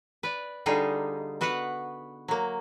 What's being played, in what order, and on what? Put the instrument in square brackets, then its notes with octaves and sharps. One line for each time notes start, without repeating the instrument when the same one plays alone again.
[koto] B4 D5
D3 G3 D#4 F4 G#4
B3 F#4 B4 F5 F#5
F#3 A#3